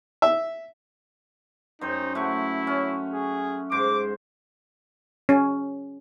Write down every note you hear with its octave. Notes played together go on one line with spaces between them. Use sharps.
E5
F#2 D#4 C5 G5
A3 E4 F#5 C#6
C#4
G#4
G#2 C5 D6
C#4